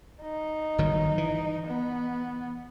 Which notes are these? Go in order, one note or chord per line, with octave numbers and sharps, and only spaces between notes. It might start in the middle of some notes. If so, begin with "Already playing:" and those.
D#4
G1 D#3 F#3
E3
B3